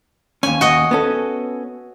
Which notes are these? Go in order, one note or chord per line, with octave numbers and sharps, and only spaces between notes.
D#2 C#4 G#5
F#4 D#5
B3 C#4 A4